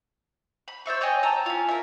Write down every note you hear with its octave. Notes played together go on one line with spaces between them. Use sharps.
B5
C5 D5 E5 C#6
C#5 D#5 G5 G#5
A5 A#5 E6
C#4 F4
A#4 E5